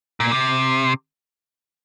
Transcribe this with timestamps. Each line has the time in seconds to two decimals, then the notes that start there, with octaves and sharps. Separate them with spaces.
0.20 A#2
0.32 C3